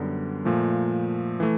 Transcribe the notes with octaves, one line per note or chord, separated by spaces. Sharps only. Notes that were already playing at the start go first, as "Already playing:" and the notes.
Already playing: F#2 D3 G3 B3
A#2 F3 A3
E3 A3